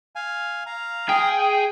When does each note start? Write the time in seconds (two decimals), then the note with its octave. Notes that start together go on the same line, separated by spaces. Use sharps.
0.16 F5 G#5
0.66 F5 A#5
1.09 G#4 G5